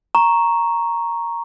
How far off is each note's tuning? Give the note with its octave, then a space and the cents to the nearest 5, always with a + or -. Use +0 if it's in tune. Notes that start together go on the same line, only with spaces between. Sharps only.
A#5 +0 C#6 -5